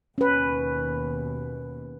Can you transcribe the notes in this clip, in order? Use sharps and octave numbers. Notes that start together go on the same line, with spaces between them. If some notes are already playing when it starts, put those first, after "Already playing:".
D#2 B2 C#4 B4